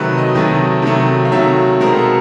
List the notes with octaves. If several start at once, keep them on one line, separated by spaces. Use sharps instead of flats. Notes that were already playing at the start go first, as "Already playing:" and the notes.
Already playing: C3 D#3 F#3 A3 B4
D#5
C3 D#3 F#3 A3
C3 D#3 F#3 A3
F5
C3 D#3 F#3 A3 E5
B2 G#3 C4 A#4
A4